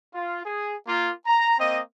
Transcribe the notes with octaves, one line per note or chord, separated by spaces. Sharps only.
F4
G#4
A#3 F4
A#5
A#3 C4 D#5